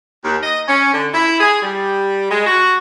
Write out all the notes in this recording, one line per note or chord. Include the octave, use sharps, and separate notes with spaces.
D#2
D#5
C#4
D3
E4
G#4
G3
G#3
F#4